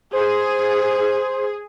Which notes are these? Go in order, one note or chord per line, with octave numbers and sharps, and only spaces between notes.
G#4 C5